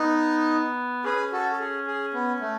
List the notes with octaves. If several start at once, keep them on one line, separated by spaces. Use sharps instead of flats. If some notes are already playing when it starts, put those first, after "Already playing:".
Already playing: B3 D#4
C#4 G#4 B4
F#4 A4
A4
G#4
G#4
B3
A3